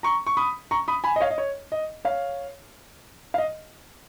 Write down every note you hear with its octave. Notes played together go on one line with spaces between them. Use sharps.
A#5 C#6
C#6
B5 D#6
A#5 C#6
B5 D#6
G#5 B5
D#5
C#5 F5
D#5
C#5
D#5
C#5 F5
F5
D#5